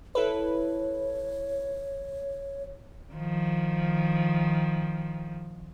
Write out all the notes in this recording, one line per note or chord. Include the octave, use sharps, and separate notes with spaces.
E4 A4 B4 C#5
D#3 F3